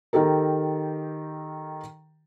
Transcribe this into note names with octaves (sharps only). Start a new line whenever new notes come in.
D#3 D#4 G4 A4 A#4